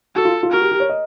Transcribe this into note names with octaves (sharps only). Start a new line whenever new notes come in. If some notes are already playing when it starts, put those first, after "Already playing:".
F#4 A4
F4
F4
F#4 A#4
G4
G4
C#5
D#5